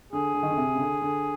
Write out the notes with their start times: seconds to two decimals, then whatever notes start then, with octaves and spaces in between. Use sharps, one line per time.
0.13 D3 G#4
0.34 D3
0.43 D#3
0.50 D3
0.57 C3
0.75 C#3
0.80 D3
1.02 D3